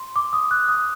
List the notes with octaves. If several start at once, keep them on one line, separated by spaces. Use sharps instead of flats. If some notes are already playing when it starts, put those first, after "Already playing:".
Already playing: C6
D6
D#6
F#6
D#6